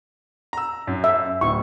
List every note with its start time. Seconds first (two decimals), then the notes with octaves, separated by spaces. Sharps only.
0.53 A#5 E6
0.87 F#2
1.04 E5
1.41 D1 C#6